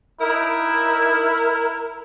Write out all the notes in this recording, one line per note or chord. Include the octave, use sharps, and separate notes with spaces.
D#4 E4 A#4